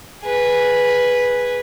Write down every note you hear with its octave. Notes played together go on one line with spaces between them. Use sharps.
G#4 B4